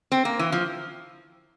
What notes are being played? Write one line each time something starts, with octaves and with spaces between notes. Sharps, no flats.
C4
A#3
E3
F3